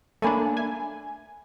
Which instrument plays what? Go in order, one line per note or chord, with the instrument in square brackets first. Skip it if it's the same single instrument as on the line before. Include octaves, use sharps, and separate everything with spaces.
[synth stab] A3 A#3 D4 [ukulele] C#5 G#5 B5
[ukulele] E5 [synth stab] G#5